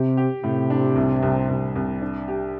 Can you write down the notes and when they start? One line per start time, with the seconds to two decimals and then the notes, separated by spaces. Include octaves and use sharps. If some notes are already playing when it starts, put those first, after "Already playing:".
Already playing: C3 G4
0.17 G4
0.44 A2 C3
0.70 D4
0.96 C2
1.22 C2
1.49 C2
1.75 C2
2.02 D4
2.28 G4